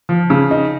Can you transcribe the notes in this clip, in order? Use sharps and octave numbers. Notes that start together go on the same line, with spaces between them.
F3
C#3
D#4